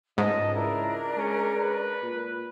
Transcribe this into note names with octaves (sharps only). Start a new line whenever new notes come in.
C#2 G#2 D#5 A5
D4 E4 A#4
G#3 C#4
B4
A#2